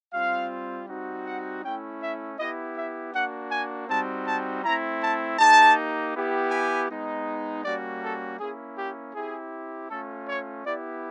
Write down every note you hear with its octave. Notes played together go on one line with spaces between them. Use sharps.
G3 C4 F4 F5
G3 C4 D#4 F#4
F#5
A3 C#4 E4 G5
E5
B3 E4 G4 D#5
E5
A#3 D4 F#4 F#5
G#5
G3 C4 D#4 F#4 A5
A5
A3 C4 E4 A#5
A5
A#3 D#4 G4 A5
B3 E4 G4
G#5
G#3 B3 D#4
G3 A#3 C#4 F#4 D5
A4
A#3 C#4 E4 G#4
G4
C4 E4 G4 G#4
A3 C#4 F4 A4
C#5
B3 E4 G4 D5